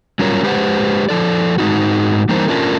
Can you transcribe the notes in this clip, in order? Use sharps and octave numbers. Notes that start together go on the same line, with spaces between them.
F#3 G3 C#4 F4 A#4 C#5
G#3 G4 B4 C5 F5 F#5
F3 A4 D5
G#2 C3 D#4 F#4
E3 G3 A#3 D#4 A#4 C5
A3 C#4 D4 F4 A#4